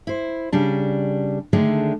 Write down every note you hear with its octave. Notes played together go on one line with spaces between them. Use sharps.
E4 C5
C#3 G3 D4
D3 D#3 G#3 A3 D4